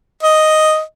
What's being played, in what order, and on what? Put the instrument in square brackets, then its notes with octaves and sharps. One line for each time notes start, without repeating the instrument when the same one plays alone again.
[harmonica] D#5